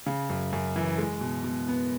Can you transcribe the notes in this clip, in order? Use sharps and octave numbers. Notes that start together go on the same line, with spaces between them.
C#3
F#2
F#2
E3
G#3
B2
B2
B3